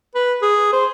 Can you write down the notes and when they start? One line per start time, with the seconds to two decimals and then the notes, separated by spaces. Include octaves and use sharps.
0.15 B4
0.42 G#4
0.72 C5